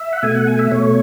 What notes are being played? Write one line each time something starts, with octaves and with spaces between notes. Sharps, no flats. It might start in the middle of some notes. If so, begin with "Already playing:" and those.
Already playing: E5
F#5
B2 A3 G#5
F#5
G#5
E5
B2 A3 C#5